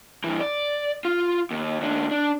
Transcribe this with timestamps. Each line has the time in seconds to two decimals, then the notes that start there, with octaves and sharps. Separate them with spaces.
0.24 G2 E3
0.40 D5
1.05 F4
1.51 D#2
1.81 D#2 D4
2.11 D4